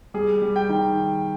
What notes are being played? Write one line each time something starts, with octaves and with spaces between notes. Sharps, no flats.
G3 G#4
G3
G5
D#3